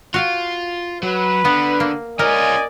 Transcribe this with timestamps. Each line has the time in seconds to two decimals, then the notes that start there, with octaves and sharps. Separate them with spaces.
0.14 F4 F#4 F5 G5
1.03 F#3 B4
1.45 D3 B3
1.80 A#3
2.19 C#4 F4 A#4 D5 D#5 G#5